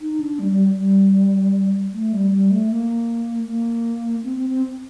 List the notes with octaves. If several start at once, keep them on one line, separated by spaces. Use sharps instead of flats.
D#4
D4
G3
G3
G3
A3
G3
G3
A3
A#3
A#3
C4
C4
C4